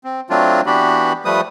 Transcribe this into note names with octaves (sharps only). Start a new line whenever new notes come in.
C4
F#3 A3 C4 D4 F4
E3 B3 D4 F#4 G4 B5
F3 G3 A3 B4 D#6